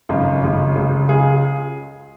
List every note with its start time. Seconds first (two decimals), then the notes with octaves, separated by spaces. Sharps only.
0.09 G#1 F#2 C#3 F4
0.43 G#1 F#2 C#3
0.76 C#2 C#3
1.09 C#2 C#3 F4 G#4